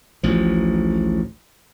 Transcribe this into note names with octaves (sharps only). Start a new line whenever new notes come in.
A1 D2 F3